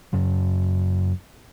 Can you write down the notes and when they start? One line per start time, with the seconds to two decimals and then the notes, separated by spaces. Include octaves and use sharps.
0.13 F#2 C#3 F#3